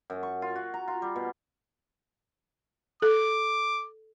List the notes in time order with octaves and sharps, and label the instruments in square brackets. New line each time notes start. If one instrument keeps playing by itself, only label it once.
[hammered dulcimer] F#2
C#6
F4
F#4
A#5
F4
G3
B2
[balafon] A4 [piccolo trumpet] D6